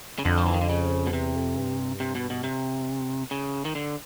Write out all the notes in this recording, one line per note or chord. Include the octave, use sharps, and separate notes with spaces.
C#3
F2 D3
F3
E3
D#3
D3
C#3
B2
E2 C3
F2
G2
C3
B2
B2
C3
C#3
D#3
D3